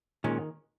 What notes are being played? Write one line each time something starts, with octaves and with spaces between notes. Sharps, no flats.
A#2 D#3 G#3 C#4